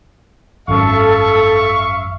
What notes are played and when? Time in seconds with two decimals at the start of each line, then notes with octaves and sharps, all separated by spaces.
0.68 G#1 F#2 A4 E5 F5 C#6